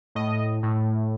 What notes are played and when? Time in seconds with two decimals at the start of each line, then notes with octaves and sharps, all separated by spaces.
0.15 A2 D#5
0.63 A2